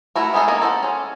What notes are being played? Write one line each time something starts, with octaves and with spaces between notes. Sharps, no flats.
A3 E4 F#4 A#4
B3 C#4 D#4 G#4 A4
A#3 C#4 A#4 D#5
A4 C5 D#5 F#5
C#4 G#4